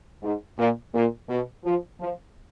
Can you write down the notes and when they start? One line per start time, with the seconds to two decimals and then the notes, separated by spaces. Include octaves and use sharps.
0.22 G#2
0.58 A#2
0.94 A#2
1.29 B2
1.64 F3
2.00 F3